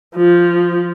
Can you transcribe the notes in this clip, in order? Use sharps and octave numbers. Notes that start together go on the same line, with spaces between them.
F3